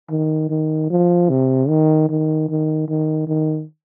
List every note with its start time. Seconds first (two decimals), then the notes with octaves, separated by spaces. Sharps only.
0.10 D#3
0.50 D#3
0.90 F3
1.30 C3
1.69 D#3
2.09 D#3
2.49 D#3
2.88 D#3
3.27 D#3